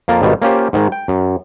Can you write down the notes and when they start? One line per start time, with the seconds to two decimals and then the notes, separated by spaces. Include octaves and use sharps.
0.08 F2 A#3 F4 A#4 A5
0.22 G#1 B2 D#3 G3 F4
0.42 A#3 C#4 F4 G4 C5
0.73 G#2 D#3 G#3
0.92 G5
1.08 F#2